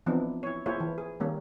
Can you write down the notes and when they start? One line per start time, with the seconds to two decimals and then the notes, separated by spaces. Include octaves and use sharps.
0.06 E3 F3 B3 C4 D4 D#4
0.43 E4 C#5
0.66 A#3 E4 F4 G#4 C5 C#5
0.80 E3
0.98 G#4
1.20 D#3 G3 A#3 C#4